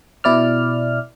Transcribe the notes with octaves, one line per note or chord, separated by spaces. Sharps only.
B2 E4 D5 F6